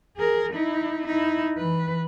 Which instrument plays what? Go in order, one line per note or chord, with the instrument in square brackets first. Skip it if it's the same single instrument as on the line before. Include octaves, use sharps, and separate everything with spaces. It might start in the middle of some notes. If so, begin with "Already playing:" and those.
[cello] G#4 A#4
D#4 E4
D#4 E4
E3 B4